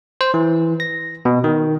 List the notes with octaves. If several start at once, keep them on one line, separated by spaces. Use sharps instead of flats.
C5
E3
A#6
B2
D#3